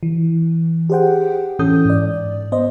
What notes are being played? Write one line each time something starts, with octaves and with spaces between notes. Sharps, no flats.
E3
G4 G#4 C5 F#5 G5
A2 E3 C#4 A4 D#6 G6
G#2 D5
B3 C5 D#5